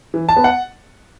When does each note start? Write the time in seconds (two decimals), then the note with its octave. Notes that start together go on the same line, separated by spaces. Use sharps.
0.14 E3
0.29 A5
0.36 B3
0.44 F#5